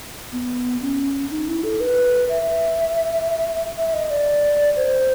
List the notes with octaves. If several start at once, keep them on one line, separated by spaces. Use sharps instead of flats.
B3
C#4
D#4
E4
A4
B4
E5
E5
D#5
D5
C5